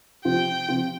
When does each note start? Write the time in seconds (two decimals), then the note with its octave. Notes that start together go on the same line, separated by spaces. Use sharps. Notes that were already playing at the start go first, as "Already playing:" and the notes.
0.25 C3 F3 C4 F4 G5
0.68 C3 F3 C4 F4